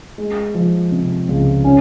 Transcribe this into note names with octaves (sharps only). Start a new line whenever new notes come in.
G#3
F3
C3
C#2
C#4